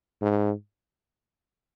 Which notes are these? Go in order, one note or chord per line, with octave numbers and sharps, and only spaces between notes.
G#2